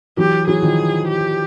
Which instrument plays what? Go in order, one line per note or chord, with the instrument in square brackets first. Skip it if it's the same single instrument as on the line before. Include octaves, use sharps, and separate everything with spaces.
[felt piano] E3 F#3 [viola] G4
[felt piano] E3 F#3 [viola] G#4
[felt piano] D#3 F3
[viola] G4